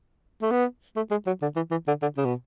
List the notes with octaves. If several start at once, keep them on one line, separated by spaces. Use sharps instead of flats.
A3
B3
A3
G#3
F#3
D3
E3
E3
D3
D3
C#3
B2